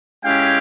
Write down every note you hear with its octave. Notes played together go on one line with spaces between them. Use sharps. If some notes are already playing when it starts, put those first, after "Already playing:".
G#3 C#4 E4 G4 F5 G5